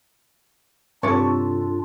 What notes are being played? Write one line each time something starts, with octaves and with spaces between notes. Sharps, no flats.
G2 C3 D4 F4 A4 C#5 D5 A5